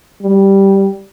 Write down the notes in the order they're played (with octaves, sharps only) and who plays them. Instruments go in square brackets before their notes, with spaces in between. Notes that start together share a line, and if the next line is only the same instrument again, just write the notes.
[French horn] G3